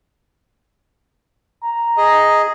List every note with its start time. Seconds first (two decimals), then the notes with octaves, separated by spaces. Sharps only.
1.63 A#5
1.97 G#4 D#5